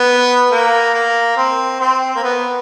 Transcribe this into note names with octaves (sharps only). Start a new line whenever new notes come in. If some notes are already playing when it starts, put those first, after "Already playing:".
Already playing: B3
A#3
A#3
C4
C4
A#3
B3